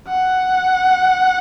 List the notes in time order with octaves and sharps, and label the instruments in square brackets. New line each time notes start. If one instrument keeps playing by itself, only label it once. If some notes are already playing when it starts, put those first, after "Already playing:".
[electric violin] F#5